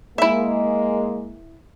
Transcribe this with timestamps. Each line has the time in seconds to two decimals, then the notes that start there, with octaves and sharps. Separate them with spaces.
0.18 G#3 A#3 E4 E5